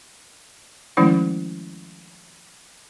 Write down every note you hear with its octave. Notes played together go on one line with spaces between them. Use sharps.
D#3 F3 G#3 A3 C#4 E4